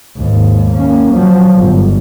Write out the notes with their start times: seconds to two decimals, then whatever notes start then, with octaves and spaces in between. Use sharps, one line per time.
0.17 D#2 G#2
0.71 A#3 C#4
1.13 F3 F#3
1.56 G1